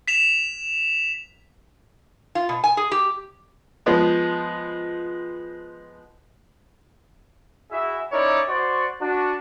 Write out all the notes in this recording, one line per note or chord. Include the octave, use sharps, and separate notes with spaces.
B6 E7 F7
F4
B2
G#5
G#4
G4
F3 G#3 B3
E4 F#4 G#4 E5
C#4 D#4 E4 A#4 C#5 D5
F#4 C5 D5 C#6
D4 F#4